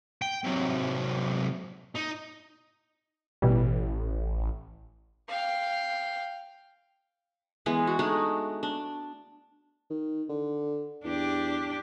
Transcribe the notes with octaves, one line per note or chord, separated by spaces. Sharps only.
G5
C3 F#3
D#4
A1 B2 E3 G3
F5 G5
E3 G#3 B3
F#4
G#3 A3 D4 D#4
D4
D#3
D3
E2 D4 G4